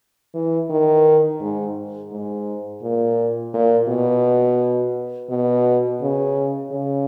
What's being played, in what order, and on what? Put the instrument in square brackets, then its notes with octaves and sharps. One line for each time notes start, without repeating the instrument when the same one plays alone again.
[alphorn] E3
D#3
G#2
G#2
A#2
A#2
B2
B2
C#3
C#3